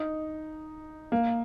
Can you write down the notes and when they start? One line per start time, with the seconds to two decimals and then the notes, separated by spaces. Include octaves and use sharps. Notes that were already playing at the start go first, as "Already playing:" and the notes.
Already playing: D#4
1.12 A#3